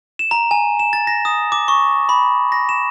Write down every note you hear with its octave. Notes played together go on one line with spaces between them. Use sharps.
E7
A#5
G#5
E7
A6
A#6
D#6
D6
C#6
B5
A#6
E7